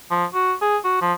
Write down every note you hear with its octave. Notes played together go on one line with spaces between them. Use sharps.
F3
F#4
G#4
F#4
F3